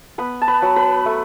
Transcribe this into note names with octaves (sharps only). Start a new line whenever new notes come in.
B3 B4 B5
A5
B4 B5
F#3
B4 B5
A3